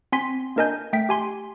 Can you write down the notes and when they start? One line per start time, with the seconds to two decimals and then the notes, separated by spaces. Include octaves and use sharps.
0.12 C4 G#5 C6 B6
0.56 A#3 D4 A#4 D#5 G#5 G6
0.93 A3 G5 B6
1.09 G4 G#5 C6